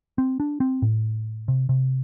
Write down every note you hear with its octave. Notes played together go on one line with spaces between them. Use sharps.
C4
D4
C4
A2
C3
C3